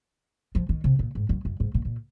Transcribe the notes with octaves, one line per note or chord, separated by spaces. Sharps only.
F3
D#3
C3
A#2
G#2
F#2
F#2
G#2
A#2
A#2